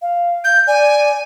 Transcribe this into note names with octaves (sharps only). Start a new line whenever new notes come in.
F5
G6
D5 G#5